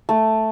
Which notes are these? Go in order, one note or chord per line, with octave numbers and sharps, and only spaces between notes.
A3